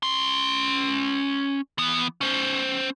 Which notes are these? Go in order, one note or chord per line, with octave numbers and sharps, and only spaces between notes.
C#4 C6
E3 B3
C#4 C5